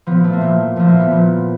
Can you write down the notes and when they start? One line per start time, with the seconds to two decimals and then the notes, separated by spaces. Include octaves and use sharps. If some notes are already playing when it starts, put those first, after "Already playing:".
0.07 A#2 F3 B3
0.24 A3
0.33 A#3
0.41 A#2 F3
0.76 A#2 F3 A3
0.88 A#3
1.00 B3
1.11 A#2 F3